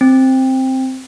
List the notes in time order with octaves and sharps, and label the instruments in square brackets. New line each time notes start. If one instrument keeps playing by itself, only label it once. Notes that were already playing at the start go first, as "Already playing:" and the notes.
[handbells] C4